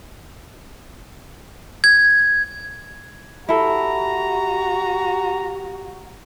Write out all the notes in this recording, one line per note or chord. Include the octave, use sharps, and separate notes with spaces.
G#6
E4 F#4 G4 A4 A#5